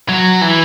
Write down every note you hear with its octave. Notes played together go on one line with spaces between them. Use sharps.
F#3
E3